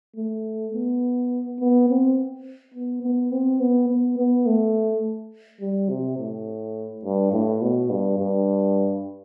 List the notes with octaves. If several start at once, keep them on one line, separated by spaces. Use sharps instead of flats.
A3
B3
B3
C4
B3
B3
C4
B3
B3
B3
A3
G3
C3
A2
G2
A2
B2
G2
G2